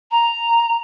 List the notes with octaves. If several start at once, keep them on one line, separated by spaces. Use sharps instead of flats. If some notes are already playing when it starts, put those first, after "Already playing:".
A#5